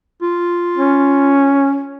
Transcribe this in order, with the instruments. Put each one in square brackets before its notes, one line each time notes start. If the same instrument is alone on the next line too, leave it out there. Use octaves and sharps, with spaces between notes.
[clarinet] F4
[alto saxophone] C#4